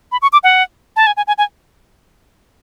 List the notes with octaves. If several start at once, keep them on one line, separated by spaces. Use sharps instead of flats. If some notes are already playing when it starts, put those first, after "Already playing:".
B5
C#6
D6
F#5
A5
G#5
G#5
G#5
G#5